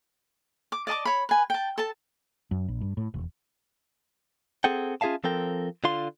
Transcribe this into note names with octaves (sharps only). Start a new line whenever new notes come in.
D6
D5 D#5 A5 D6
C#5 B5
B4 G#5
G5 A5
A4 A5
F#2
A#1
G2
A2
E1
C4 G#4 A4 F#5 G5
C#4 F4 G#4 E5 F5 A5
F3 C4 A4 A#4 G5
D3 F4 F5 C6